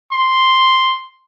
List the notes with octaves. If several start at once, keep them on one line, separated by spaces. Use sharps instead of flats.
C6